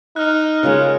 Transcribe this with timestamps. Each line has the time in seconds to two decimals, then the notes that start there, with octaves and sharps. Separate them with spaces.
0.16 D#4 F6 F#6
0.63 C#3 G#3 C#4 F4 A#4